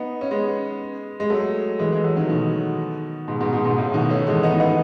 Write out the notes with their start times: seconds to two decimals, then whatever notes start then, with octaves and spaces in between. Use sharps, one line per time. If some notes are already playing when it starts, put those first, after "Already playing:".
Already playing: B3 D#4
0.21 C#4
0.31 G#3 B3
1.20 G#3
1.30 F#3 A3
1.79 E3 G#3
1.92 E3 G#3
2.04 F#3 A3
2.17 D#3 F#3
2.29 B2 D#3
3.28 G#2 B2
3.40 G#2 B2
3.53 G#2 B2
3.65 G#2 B2
3.78 A2 C#3
3.94 B2 D#3
4.10 A3 C#4
4.27 E3 G#3
4.43 B3 D#4
4.60 B3 D#4